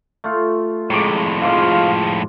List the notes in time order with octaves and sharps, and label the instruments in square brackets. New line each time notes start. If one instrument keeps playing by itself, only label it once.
[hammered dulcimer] A3 F4
[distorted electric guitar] F2 A2 [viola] G#3 [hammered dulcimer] A#5 C#6 D6
[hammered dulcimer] G#2 C6 D6 [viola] F3 G#4 [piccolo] F5